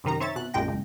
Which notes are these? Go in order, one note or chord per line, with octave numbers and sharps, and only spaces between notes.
F#2 C3 D#3 D#4 A#5
C4 C#5 E5 A6
B2 F#6
A#1 F#2 A#2 G#3 G5 A#6
C#2